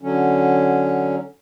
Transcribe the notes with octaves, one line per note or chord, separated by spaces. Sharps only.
D3 F#3 C#4